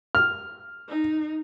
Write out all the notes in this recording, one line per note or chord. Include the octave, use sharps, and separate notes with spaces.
F6
D#4